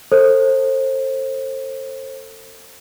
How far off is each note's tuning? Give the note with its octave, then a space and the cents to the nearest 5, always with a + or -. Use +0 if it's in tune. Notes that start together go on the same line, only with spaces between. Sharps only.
A4 +30 C5 +25